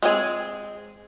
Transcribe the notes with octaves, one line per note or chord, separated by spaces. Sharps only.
G#3 C4 G#4